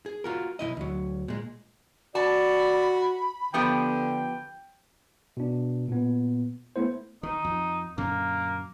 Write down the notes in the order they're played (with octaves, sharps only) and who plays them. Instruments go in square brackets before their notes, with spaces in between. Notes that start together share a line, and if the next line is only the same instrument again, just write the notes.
[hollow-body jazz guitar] G#4
F4 F#4 A#4
B1 B2 E4 D#5
D2 F#3
A#2 G#3
[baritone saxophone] F#4 [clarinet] D5 [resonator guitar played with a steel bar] A5 [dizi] B5
[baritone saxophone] D3 [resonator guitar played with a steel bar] F3 B3 G4 [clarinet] G5
[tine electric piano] B2 D4
A#2 B3
A3 B3 E4 C5
[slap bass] D#3 [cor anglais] D#4
[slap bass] F2
[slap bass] F#2 A#2 D3 [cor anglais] A#3